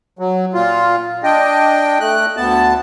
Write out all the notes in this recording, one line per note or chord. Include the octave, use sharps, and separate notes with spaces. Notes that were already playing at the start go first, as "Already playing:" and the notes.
F#3
A#2 F4
D4 D#5 G5
A3 F#6
D2 B3 A5